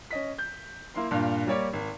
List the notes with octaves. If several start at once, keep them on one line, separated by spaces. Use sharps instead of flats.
C#4 D#5 B6
G6
A#3 E4 C6
G2 A#2 F5
G3 A#3 G4 C#5 D5
G#1